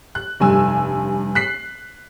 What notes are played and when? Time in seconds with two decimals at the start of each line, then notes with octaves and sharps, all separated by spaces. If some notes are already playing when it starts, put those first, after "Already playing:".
0.15 F#6
0.40 F1 G2 G#5 E6
1.35 F#6 B6 C7